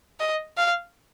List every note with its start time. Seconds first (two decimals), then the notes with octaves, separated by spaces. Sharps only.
0.20 D#5
0.57 F5